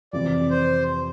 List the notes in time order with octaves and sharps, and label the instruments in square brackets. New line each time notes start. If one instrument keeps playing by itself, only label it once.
[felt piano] F2 C3 E3 [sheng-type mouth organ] D5
[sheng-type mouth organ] C5